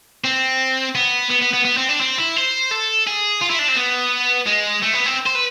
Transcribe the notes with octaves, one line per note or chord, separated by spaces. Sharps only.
C4
B3
B3
B3
B3
B3
C4
D4
C4
E4
C5
A4
G#4
F4
E4
D4
C4
B3
G#3
A3
B3
C4
C5
B4